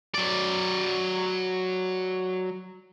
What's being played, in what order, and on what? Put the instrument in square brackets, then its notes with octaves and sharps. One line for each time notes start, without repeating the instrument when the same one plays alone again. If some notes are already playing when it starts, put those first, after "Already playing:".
[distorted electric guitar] F#3 D5